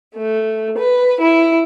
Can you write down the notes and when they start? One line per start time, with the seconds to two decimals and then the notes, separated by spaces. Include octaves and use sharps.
0.18 A3
0.79 B4
1.21 E4